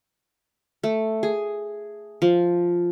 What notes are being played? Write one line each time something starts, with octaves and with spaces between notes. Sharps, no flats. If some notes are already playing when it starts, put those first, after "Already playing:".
A3
G#4
F3